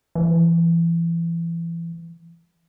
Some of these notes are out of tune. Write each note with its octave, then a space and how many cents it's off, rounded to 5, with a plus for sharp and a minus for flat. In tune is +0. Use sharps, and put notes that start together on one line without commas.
E3 +30